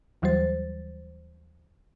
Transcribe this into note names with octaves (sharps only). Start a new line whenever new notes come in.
D#2 E3 F#3 G3 C5 A6